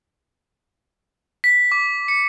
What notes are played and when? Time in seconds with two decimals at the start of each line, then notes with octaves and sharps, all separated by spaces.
1.44 B6
1.72 D6
2.08 C#7